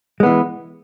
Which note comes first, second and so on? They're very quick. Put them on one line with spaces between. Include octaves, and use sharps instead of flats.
G#3 B3 E3